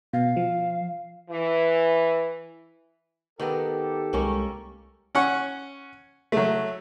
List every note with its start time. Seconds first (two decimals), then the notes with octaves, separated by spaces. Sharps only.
0.13 B2 F5
0.37 F3
1.31 E3
3.40 D#3 B3 G4 A4 A#4
4.13 C2 G#3 A#3 C#4 A#4 C#6
5.15 C#4 F#5 C#6
6.32 F#3 A3